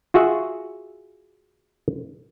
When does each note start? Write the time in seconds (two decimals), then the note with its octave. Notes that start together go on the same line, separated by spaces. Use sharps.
0.14 F4 F#4 G#4 E5 F#5